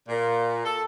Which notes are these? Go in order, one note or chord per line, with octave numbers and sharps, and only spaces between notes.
A#2
A4